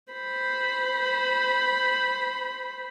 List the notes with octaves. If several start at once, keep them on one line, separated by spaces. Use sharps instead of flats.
C5 B5